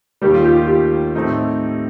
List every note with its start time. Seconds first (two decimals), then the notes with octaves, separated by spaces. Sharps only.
0.22 D#2 D#3 G3 G4
0.34 F4
0.45 G4
0.56 F4
0.68 G4
1.15 A2 A3 C4 D#4